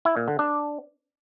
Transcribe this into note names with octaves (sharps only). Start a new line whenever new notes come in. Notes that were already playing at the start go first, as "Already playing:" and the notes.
E4
A#2
D3
D4